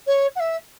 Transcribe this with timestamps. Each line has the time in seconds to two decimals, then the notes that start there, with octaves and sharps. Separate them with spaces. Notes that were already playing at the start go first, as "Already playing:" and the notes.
0.06 C#5
0.35 F#5
0.39 E5